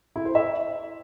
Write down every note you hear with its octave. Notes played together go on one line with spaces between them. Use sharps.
E4
C5
E5